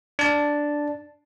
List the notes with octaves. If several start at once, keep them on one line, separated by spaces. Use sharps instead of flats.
D4 A5